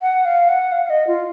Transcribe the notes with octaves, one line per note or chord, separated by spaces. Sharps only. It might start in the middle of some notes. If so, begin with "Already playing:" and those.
F#5
F5
F#5
F5
F5
D#5
F4